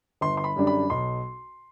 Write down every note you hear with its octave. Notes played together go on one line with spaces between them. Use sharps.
G1 C6
C6
B5
F#2 D3 G3 D4
B5
B1 C6